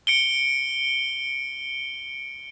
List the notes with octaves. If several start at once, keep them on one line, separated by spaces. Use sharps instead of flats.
C#7 D7 G7